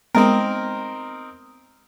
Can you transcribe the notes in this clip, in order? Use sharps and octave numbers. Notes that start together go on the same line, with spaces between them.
G#3 B3 C4 D#4 A#4